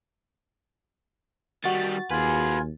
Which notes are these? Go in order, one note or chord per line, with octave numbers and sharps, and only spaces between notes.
D#3 G3 F#4 A6
D#2 F4 G#4 B4 G#5